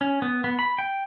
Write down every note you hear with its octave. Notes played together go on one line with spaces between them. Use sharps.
C#4
B3
B3
B5
G5